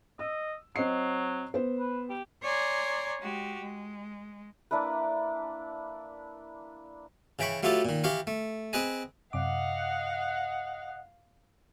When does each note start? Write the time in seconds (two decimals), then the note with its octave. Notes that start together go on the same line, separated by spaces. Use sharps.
0.19 D#5 E6
0.76 F#3 C4 D#5 C7
1.54 B3 C5
1.78 B4
2.09 G4
2.42 C#5 D5 G#5 A#5 C6
3.21 G#3 F#4 G4
3.62 G#3
4.71 A#3 D4 E4 B4
7.39 C#3 E3 G5 B5 C#6
7.63 F#3 A3 E4 F4 G4 A4
7.85 A#2 D#3
8.04 E3 G4 F5 C#6
8.27 A3
8.73 C4 G#4 B4 D#5 G#5
9.33 F#2 C3 D#5 F5 F#5 D6